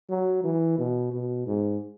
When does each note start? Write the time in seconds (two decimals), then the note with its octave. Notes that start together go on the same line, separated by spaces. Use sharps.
0.10 F#3
0.44 E3
0.78 B2
1.12 B2
1.47 G#2